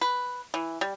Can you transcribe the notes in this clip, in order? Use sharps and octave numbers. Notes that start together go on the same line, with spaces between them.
B4
E3
G3